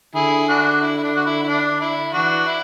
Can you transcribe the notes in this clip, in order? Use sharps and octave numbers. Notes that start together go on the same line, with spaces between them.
D3 E4 G#4
D4 F#4
E4
E4
D4
F#4
E4
E4
D4
E4
E3 D4 F#4
E4